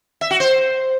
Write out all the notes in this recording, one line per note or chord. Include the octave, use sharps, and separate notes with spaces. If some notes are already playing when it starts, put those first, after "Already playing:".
E5
F#4
C5